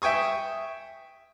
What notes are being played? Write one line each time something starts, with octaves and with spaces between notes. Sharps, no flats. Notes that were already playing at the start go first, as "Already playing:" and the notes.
E5 G5 G#5 C#6 D#6